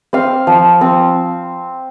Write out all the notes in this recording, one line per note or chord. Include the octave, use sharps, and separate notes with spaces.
C4 F5
F3
C4